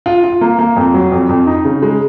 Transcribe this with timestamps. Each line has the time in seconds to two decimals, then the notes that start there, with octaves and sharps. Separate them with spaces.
0.06 F4
0.24 F4
0.41 A#3
0.59 A#3
0.76 F2
0.94 F#3
1.12 F2
1.29 F2
1.47 D#4
1.65 C#3
1.82 G#3